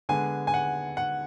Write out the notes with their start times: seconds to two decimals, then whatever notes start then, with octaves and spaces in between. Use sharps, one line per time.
0.09 D3 G#3 B3 G#5
0.47 G#5
0.54 F#5
0.97 F#5